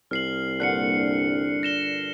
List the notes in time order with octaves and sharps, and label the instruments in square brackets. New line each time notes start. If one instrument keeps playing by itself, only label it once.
[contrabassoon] C2 [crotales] F6 C7 F#7
[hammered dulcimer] G2 A#2 D3 [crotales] F#6 C7 C#7
[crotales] A#6 E7 G7